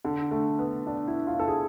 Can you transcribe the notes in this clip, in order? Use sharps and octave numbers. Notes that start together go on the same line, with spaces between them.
D3
A3
B3
D4
E4
F4
A4
G#4